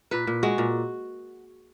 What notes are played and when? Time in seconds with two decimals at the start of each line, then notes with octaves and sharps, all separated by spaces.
0.11 A#2 B4
0.27 A#2
0.43 G#3 F#4
0.58 A#2